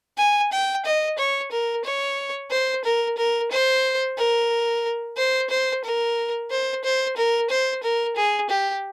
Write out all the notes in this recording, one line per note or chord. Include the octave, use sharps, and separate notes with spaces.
G#5
G5
D#5
C#5
A#4
C#5
C5
A#4
A#4
C5
A#4
C5
C5
A#4
C5
C5
A#4
C5
A#4
G#4
G4